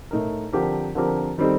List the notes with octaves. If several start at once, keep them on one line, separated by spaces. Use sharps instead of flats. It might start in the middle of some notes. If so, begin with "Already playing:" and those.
A2 A3 D#4 A#4
D3 F3 C4 G4 A#4
D3 F3 C4 G4 A#4
D#3 G3 C4 D#4 A4